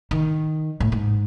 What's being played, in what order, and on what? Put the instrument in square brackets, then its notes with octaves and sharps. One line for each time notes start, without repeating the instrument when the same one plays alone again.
[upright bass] D#3
A2
G#2